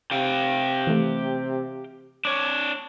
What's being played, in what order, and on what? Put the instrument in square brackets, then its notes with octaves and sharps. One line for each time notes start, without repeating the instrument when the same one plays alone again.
[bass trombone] C3 [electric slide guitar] G4 F5 G5
[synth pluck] E3 A3
[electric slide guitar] D4 C#5 [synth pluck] D6